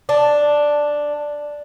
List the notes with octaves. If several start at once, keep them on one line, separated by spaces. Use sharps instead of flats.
D4 A5